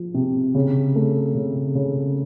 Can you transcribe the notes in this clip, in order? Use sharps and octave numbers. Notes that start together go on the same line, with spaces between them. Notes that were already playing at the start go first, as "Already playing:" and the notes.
Already playing: F3
C3
C#3
A3
C#3
C#3